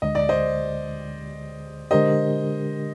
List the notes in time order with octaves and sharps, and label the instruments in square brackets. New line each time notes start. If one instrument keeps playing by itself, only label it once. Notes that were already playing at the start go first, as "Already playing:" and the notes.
[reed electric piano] D2 D3 G#3 [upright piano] D#5
[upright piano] D5
C5 D#5
[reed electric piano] D3 G#3 D4 G4 A#4 [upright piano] C5 D#5